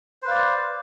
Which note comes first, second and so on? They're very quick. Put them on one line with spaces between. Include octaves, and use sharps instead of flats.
C5 B4 F5 D5